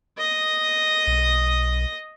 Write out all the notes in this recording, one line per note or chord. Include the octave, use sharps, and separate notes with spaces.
D#5 D#6
B1